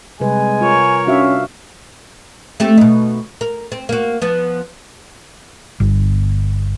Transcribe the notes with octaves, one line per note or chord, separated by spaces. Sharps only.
C3 G3 G#3 B4 G#5
F4 A#4 C#5
C#4 D4 F#4 E5 F5
A3 C4 G4
B2 D#4
A#4
C4
A#3 F#4
F3 B3
G1